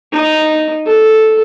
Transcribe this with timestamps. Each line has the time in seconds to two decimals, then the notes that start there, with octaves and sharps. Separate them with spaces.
0.12 D#4
0.86 A4